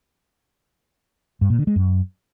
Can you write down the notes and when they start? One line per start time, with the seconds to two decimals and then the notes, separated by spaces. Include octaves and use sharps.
1.41 G2
1.50 A#2
1.59 D3
1.67 G#3
1.76 F#2